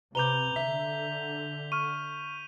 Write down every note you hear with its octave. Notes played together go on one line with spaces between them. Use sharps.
C3 B4 A#5 D6 G6 F7 G7
D3 E5 B6
C#6 F6 D#7